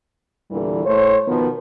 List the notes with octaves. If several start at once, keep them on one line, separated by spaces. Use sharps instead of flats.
E2 A#2 D3 E3 G3
A2 A3 C5 C#5
B2 D#3 F3 B3